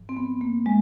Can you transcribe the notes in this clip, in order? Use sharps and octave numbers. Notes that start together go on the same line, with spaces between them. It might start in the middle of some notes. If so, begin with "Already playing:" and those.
Already playing: G#2 F3
C4
B3
A#3
G#3